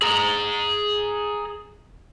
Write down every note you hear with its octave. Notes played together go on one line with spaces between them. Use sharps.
G#4 A#5